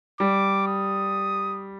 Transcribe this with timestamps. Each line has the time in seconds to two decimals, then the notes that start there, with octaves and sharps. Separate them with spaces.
0.20 G3 D6
0.68 D#6